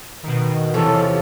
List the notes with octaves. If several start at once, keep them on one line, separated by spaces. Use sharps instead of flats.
B2 D#3
E2 C3 F3 C#4 A4